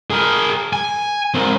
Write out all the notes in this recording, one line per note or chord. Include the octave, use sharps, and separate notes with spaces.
G#4 A#4
G#5
C4 A#4